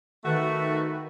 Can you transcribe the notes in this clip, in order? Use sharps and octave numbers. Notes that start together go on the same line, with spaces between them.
D#3 A3 F#4 B4